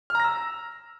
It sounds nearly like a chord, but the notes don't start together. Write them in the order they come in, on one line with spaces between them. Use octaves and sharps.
F6 A#5 A#6 E6